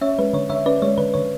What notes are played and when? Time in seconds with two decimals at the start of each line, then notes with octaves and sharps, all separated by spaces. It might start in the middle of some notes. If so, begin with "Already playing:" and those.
0.01 C#4 C#5 E5
0.18 G#3 B4
0.33 D3 C#5
0.49 D3 C#5 E5
0.66 C#4 B4 D5
0.82 G#3 C#5
0.98 D3 B4
1.14 D3 C#5